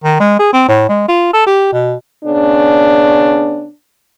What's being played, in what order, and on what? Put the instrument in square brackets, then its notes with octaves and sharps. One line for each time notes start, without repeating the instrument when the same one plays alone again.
[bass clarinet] D#3
G#3
G#4
C4
A2
G#3
F4
A4
G4
B2
[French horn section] C#3 B3 C#4 D4